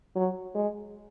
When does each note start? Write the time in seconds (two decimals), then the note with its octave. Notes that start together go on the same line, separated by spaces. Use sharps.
0.16 F#3
0.55 G#3